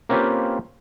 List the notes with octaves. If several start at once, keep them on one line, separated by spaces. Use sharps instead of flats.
A#3 C4 C#4 F4 G4 B4